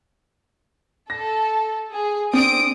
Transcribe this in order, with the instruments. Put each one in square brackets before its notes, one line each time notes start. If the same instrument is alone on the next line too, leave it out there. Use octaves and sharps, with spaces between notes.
[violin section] A4 [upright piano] A#6
[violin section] G#4
[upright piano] C4 D4 [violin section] D#6 D7